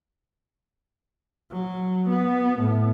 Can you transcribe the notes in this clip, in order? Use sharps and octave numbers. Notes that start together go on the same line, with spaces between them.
F#3
B3
A2